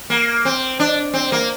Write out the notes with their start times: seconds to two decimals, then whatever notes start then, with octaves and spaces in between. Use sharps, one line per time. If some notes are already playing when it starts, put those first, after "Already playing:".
0.10 A#3
0.45 C4
0.80 D4
1.14 C4
1.32 A#3